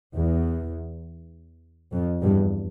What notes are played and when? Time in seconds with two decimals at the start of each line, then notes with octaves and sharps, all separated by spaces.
0.15 E2
1.92 F2
2.21 E2 G2